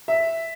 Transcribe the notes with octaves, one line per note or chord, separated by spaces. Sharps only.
E5